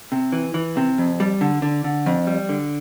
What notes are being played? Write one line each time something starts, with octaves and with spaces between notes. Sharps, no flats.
C3
E3
E3
C3
F2
G3
D3
D3
D3
F2
G3
D3